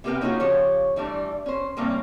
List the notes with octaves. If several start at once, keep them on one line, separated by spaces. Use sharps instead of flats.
C3 B3 G4 A#4 B4 G5
A#3 C#4 D#4 F4 F#4 G#4
C#3 F3 G4 C#5
D3 E3 G3 A3 D4
C#4 C5
A2 C#3 G3 A#3 C4